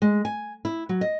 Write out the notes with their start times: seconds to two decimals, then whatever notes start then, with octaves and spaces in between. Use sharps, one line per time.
0.02 G#3
0.25 G#5
0.65 E4
0.89 F#3
1.01 D#5